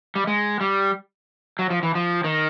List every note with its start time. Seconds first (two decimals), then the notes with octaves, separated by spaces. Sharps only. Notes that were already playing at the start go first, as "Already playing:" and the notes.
0.16 G3
0.27 G#3
0.61 G3
1.59 F#3
1.70 F3
1.83 E3
1.95 F3
2.24 D#3